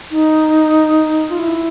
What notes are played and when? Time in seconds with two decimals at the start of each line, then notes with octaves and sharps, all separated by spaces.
0.11 D#4
1.29 F4
1.39 E4